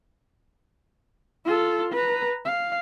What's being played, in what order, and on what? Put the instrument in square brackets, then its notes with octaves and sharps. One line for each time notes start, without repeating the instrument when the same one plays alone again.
[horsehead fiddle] F4 A4
B4 A#5
F5